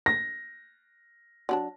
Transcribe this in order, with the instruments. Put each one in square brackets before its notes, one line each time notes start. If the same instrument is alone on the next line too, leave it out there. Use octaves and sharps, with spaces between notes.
[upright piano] A#6
[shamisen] F#3 D4 A5